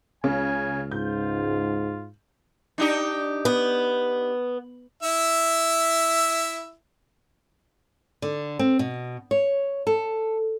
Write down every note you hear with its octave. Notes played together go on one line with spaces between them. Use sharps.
C#2 C#3 G#5
G#2 F4 G6
D4 D#4 G4
B3
E4 E5
D3
C4
B2
C#5
A4